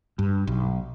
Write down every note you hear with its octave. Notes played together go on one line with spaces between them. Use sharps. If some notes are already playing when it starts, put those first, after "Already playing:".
G2
B1